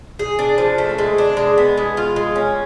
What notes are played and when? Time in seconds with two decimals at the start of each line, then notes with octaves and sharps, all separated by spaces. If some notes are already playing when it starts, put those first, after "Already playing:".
0.19 G#4
0.39 D4
0.58 F3
0.78 A3
0.98 G#3
1.18 D4
1.37 G#3
1.58 B3
1.77 G#3
1.97 F4
2.16 G#3
2.36 C#4